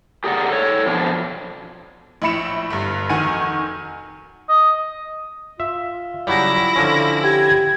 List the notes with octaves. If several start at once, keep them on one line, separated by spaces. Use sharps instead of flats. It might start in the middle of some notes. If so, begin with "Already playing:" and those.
G4 G#4 A#4 D5 F#5
A4 C#5
F2 B2 F3 D4
A#1 A2 E4 B5 C#7 E7
G1 G2
F1 D#3 F#4 G#5 D#7
D#5
F4 E5
C#3 F#3 G3 E4 A#6
D3 F3 C#4
G4 G#6